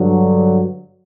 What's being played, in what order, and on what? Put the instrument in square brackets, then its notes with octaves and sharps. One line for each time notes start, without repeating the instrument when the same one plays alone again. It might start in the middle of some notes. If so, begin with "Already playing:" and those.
Already playing: [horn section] G2 D3 F#3